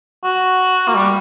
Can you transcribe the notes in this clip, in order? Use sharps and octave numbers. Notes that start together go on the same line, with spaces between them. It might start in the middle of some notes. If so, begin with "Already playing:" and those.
F#4
A#3
G3